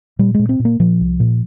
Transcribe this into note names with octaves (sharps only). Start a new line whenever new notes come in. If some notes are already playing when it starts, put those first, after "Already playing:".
A#2 G3
A#2 G#3
C4
A#2
A#3
A#2 F3
C2
A#2